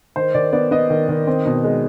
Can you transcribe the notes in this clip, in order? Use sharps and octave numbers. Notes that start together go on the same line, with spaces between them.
D#3 C5
D#3 D5
B3 D5
B3 D#5
D#3
D#3
C4
B2
G#3